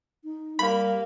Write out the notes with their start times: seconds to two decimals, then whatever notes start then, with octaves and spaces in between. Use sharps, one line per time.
0.24 D#4
0.59 G3 A#3 B5